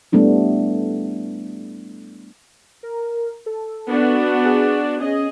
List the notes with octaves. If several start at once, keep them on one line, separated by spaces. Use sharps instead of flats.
G3 A3 B3 D4 E4
A#4
A4
B3 D4 F#4
G#4
C#4 G#4 D#5